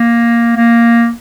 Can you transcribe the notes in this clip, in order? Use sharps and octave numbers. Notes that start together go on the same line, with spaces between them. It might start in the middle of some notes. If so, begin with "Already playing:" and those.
Already playing: A#3
A#3